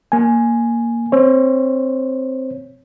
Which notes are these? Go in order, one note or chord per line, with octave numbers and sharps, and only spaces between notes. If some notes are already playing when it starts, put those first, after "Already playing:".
A#3 G#5
C4 C5 C#5